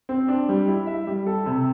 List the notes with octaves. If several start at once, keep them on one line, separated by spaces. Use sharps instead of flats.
C4
D4
G3
E4
E5
G3
A4
C3